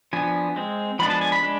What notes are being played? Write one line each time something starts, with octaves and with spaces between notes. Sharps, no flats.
F3 B3 D4 G#5
G#3 C4
F3 G#3 B3 D4 B5
A5
G#5
B5
G#3 D4